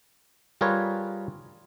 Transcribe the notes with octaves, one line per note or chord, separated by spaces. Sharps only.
G3 F4 G#4 A#4 B4 C#5